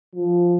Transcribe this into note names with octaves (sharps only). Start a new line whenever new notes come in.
F3